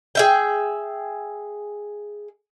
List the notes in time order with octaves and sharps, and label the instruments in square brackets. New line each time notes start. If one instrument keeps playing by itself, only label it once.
[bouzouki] G#4 E5 G5